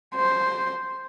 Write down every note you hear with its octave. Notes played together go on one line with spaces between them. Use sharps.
C5